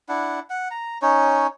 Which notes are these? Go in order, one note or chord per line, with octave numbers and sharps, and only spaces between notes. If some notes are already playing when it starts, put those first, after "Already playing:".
D4 E4 F#5
F#5
A#5
C#4 D#4 C#5